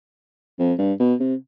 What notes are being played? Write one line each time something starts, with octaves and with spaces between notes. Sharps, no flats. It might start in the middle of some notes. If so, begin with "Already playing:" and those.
F2
G2
B2
C3